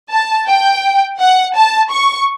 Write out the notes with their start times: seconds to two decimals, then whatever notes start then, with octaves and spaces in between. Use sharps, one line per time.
0.11 A5
0.48 G5
1.19 F#5
1.55 A5
1.90 C#6